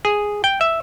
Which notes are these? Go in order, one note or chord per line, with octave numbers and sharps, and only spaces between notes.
G#4
G5
E5